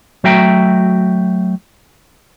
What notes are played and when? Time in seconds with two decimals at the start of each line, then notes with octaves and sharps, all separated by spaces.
0.24 F#3 A3 F#4 E5 G5 A#5